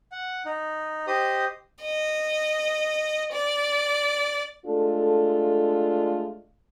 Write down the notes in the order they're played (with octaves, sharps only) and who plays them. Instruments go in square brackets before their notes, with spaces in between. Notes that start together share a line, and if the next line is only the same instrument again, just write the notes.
[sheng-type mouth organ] F#5
D#4
G4 C5 D#5 D#6
[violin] D#5
D5
[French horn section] G#3 A3 D4 F4 A4